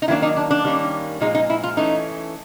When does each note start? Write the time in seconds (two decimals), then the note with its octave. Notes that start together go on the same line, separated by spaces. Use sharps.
0.02 D#4
0.08 D#3 F#3 A#3 D4 E4
0.22 D#4
0.36 D4
0.51 D4
0.65 D#3 G3 A#3 C#4
1.20 A#2 F3 G#3 D#4
1.35 D#4
1.50 E4
1.63 F4
1.77 E3 A3 C#4 D#4